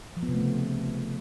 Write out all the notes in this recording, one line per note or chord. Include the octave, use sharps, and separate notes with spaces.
F3
B3
C3
A3
C#3